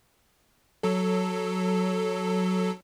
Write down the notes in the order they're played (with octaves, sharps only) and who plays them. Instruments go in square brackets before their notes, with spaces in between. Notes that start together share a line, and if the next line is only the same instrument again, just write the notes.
[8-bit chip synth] F#3 A4